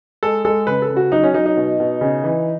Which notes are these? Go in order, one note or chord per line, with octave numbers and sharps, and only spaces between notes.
G#3 A4
G#3 A4
C#3 B4
A4
C#3
F#4
F#3 D#4
C#4
F#3 D#4
D#4
B2
B2
C#3
E3